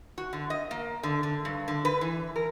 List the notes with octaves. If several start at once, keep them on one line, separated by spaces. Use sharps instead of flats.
F#4
D3
D#5
A#3
D3
D3
G2
D3
B4
E3
A#4